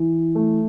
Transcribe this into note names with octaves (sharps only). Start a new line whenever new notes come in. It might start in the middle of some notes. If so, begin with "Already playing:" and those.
Already playing: E3
A3